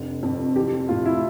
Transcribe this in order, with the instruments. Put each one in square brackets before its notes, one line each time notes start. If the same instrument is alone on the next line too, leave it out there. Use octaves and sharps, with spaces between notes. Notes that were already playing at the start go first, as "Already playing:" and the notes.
Already playing: [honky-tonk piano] F1 D3
F2
[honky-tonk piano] E3 [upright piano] G4
[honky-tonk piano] A2 [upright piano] F4
[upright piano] E4